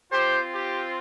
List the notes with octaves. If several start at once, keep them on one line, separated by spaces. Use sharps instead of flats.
C4 F4 G4 C5
G4